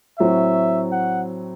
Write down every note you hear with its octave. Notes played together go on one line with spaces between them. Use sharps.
A2 F#3 C4 F#4 E5
F#5